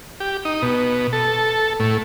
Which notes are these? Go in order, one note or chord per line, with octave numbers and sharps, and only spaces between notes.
G4
D#4
B2
A4
A2